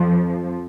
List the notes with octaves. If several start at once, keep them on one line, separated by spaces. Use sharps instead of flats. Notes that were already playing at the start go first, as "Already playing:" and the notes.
Already playing: F2 F3